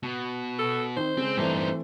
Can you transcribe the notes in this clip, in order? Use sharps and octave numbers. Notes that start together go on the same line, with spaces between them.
B2
A4
D#3 C4 D#4 C5
C#3 G#3 C4
G2 E3 A3 C4 D#4